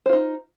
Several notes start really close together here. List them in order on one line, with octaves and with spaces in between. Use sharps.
C5 F4 D#4